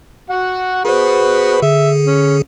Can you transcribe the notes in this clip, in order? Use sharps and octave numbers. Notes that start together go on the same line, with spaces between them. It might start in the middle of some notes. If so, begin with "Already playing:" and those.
F#4 F#5
F#4 G#4 B4 C5
D3 G#4 E5
C#4